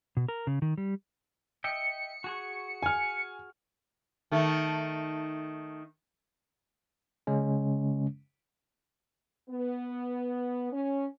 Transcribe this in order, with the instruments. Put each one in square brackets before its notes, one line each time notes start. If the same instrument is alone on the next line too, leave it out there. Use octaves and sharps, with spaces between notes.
[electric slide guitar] B2
A#4
C#3
D#3
G3
[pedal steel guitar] D#5 E5 G5 [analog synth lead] C#7
[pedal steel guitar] F#4 G#4 C#6
[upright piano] G#5 F6
[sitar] D#3 A3
[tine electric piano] C#3 G#3 C#4
[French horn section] B3
C#4